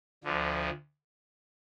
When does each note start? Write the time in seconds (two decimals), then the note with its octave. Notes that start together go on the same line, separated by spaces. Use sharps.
0.24 D2 D3 F3